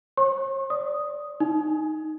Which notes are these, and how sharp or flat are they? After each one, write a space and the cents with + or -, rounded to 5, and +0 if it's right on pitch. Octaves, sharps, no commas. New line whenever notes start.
C#5 -45 C#6 -45
D5 +0 D#6 +0
D#4 +0 G#5 +5